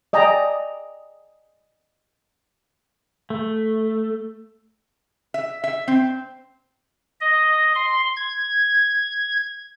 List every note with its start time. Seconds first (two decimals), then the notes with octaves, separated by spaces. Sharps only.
0.13 D5 D#5 G5 G#5 A#5
3.30 A3
5.34 E5
5.64 E5
5.88 C4
7.20 D#5
7.75 C6
8.16 G#6